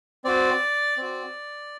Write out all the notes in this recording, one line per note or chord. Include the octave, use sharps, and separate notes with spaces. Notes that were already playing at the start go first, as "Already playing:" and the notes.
C4 F#4 D5
C4 F#4